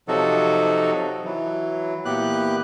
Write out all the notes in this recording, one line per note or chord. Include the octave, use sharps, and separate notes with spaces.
C3 F3 F#3 D#4 F#4 A4
E3 F#3
A#2 E3 B3 G4 F#6